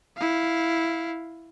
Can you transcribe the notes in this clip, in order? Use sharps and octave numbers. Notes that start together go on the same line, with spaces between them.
E4 F5